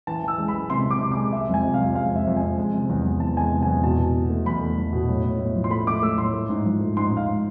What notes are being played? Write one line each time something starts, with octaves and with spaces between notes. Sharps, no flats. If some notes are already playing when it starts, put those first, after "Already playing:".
E3 A5
E3 E6
G#3
B5
G#3
C3 C6
C3 D6
C3
G#3 D6
G#3 E5
F2
G#5
C3
F5
F2
G#3 F5
F2 E5
F2
G#5
F2
G#3
C3
E2
E2
E2 A5
G#3 G#5 A5
C3
E2 G#5
B2 A5
B2
B2
A3
E2 B5
A3
E2
B2
A2
A2
A2
F3
C6
A3 B5
A3 D6
A3 E6
A2 C6
A3
G#2
F3
A3
G#2 C6
G#2
F5